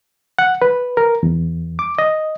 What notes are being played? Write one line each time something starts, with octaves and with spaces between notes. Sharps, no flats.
F#5
B4
A#4
E2
D6
D#5